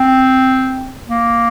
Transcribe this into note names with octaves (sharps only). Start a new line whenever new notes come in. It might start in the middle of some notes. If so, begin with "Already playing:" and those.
Already playing: C4
A#3